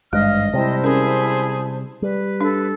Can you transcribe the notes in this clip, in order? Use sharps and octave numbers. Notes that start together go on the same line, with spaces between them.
G#1 G2 G#3 D#5 F5 F6
C3 G3 E4 C5 A5
C#4 G#4 A#4
G3 B4
D4 A4